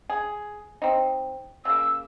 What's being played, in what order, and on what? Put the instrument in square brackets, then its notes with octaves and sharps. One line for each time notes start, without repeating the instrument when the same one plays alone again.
[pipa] G#4
C4 D#4
[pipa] C#3 A#3 [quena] E6